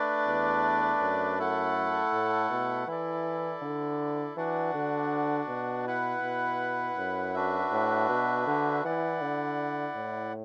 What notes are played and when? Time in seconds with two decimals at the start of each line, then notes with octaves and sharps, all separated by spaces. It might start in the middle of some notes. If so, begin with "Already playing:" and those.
Already playing: A3 D4 B4 D5
0.27 E2
1.01 F#2
1.39 A3 E4 A4 F#5
2.13 A2
2.50 B2
2.87 E3 E4 A4 D5
3.62 D3
4.36 E3 D4 F#4 D5 F#5
4.74 D3
5.48 B2
5.86 E4 B4 F#5
6.23 B2
6.97 F#2
7.34 D4 F#4 B4 E5
7.72 A2
8.09 B2
8.47 D3
8.84 E3 E4 D5 F#5
9.22 D3
9.96 A2